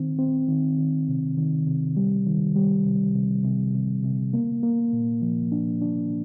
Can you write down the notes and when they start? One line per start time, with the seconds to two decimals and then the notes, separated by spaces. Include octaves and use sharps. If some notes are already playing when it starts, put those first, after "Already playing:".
Already playing: D#3 C4
0.19 C4
0.48 D#3
0.78 D#3
1.08 C3
1.37 D#3
1.67 C3
1.97 G3
2.26 D#3
2.56 G3
2.85 C3
3.15 C3
3.44 C3
3.74 C3
4.04 C3
4.33 A#3
4.63 A#3
4.93 A#2
5.22 F3
5.52 D4
5.81 D4